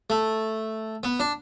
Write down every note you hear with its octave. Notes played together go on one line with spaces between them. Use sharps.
A3
B3
D4